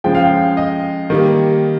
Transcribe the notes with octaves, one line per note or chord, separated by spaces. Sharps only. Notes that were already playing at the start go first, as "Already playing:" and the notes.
C#3 F3 G#3 G5
F5
G5
D#5
D#3 G3 A#3